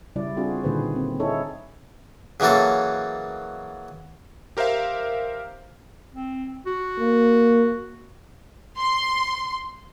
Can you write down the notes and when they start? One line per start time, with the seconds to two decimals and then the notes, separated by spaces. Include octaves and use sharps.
0.16 C#3 G3 E4 D5
0.37 C4 D4 F4 F#4 G#4
0.63 A#2 D3 D#3 G#4 B4 C5
0.96 C4
1.20 D#4 E4 G#4 A4 C#5
2.40 C#3 E3 F#3 A#3 A4
4.57 G4 A#4 C5 E5 F5
6.14 C4
6.66 F#4
7.00 A#3
8.78 C6